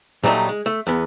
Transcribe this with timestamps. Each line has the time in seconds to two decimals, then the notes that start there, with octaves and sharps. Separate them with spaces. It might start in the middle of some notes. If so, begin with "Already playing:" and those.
0.23 A#2 F#3 G3 A3 D#4
0.49 G#3
0.66 A3
0.87 E2 B3